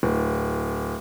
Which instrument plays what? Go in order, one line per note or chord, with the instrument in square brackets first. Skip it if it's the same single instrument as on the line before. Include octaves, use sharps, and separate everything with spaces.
[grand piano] D1